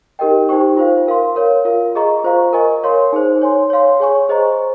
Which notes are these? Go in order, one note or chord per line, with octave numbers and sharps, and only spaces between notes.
D#4 G4 A#4 D#5 G5
D#4 G4 C5 G5 C#6
F4 C5 F5
A#4 F5 C6
A#4 C#5 F5
F4 A#4 F5
G#4 D#5 A#5 C#6
F4 C5 F5 A#5 C#6
A#4 D#5 G#5 C#6
A#4 C#5 F5 C6
D#4 G#4 C5
C#5 G#5 C6
C#5 F5 C6
G#4 C#5 G#5 C#6
G#4 C5 D#5 A#5 C#6
C5